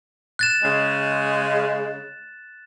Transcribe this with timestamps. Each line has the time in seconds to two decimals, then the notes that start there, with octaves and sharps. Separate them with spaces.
0.39 F#6 A6 E7
0.63 C#3 G#3